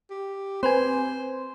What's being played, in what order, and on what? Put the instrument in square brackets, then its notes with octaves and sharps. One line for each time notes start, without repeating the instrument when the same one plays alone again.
[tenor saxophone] G4
[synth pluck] C4 B4 G#5 [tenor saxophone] C5